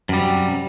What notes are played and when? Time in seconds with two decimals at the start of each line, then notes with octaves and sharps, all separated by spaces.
0.09 F#2
0.13 G3
0.17 C3